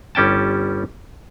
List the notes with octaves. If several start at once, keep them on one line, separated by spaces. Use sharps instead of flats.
G1 G3 C#4 G5 A5